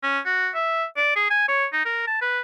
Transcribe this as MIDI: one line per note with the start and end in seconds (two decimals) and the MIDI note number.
0.03 0.20 61
0.26 0.50 66
0.55 0.84 76
0.97 1.11 74
1.16 1.26 68
1.30 1.43 80
1.48 1.66 73
1.73 1.85 63
1.85 2.07 70
2.07 2.21 81
2.22 2.41 71